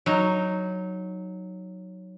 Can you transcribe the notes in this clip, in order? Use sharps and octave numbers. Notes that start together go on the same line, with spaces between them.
F#3 D#4